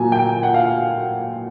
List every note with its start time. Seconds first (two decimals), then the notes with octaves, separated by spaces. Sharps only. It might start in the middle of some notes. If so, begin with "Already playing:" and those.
Already playing: A#2 F#3 A#3 G#5 A#5
0.12 G5
0.43 F#5
0.54 F5